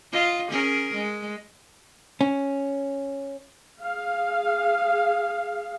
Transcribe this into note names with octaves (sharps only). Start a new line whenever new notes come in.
F4 D#5
C#4 G#4 A#4
G#3
C#4
G#4 F5